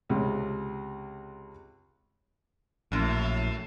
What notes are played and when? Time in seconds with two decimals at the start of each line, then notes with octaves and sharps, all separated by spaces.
0.10 C#2 C3
2.92 A#1 F#2 A2